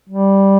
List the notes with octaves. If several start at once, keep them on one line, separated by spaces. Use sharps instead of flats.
G3